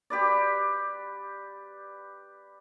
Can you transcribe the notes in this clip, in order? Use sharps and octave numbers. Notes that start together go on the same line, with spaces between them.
G4 B4 D5